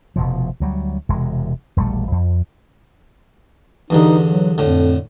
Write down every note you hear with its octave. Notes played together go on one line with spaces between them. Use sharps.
F1 B2 F3
D2 F#3 G3
E1 C3 G#3
E1 A#1 G3 A3
F2
E2 G2 D3 D#4
F#3
F2 A2 D3